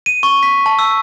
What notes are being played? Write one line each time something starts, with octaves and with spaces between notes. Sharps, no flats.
D#7
C#6
B6
A5
E6